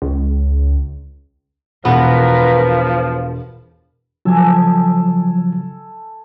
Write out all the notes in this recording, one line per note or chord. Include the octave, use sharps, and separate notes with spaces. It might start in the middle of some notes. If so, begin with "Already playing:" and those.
C#2
E1 F3 B3 A#4 B4
C#3 F3 F#3 A4 G#5